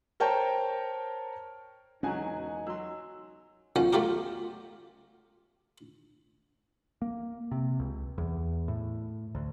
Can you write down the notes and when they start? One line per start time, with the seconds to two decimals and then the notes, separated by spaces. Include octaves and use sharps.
0.20 A#4 C5 C#5 G5 A5
2.03 E1 C#3 F#3 C#4 D#4 F#4 G#5
2.67 F#3 C6 E6
3.76 B1 F3 C#4 F#5
3.93 F#3 A3 F4 G4 A#4
7.02 A#3
7.51 C3
7.79 C#2
8.18 E2
8.68 A2
9.35 D2